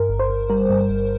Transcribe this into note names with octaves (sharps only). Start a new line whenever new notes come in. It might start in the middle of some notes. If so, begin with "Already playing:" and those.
Already playing: G2 A#4
G1
C5
G1
G3 A#4
G2
G1